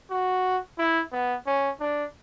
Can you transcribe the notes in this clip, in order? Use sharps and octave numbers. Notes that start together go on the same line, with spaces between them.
F#4
E4
B3
C#4
D4